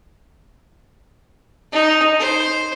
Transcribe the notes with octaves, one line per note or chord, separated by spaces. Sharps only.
D#4
C5